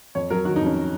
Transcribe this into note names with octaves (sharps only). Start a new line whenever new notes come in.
F2 C#5
F#3 A#4
D#3 F#4
D#4
F2 C#4